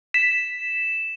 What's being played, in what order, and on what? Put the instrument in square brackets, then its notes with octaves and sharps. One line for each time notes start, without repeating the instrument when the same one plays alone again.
[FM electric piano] B6 [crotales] E7